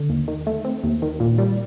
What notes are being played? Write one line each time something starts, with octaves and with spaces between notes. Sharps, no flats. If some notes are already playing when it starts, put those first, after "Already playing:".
Already playing: D3
D#2
D#3
A3
C4
D#2
D#3
A#2
G3